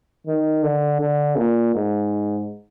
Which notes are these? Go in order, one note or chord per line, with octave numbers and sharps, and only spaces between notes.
D#3
D3
D3
A#2
G#2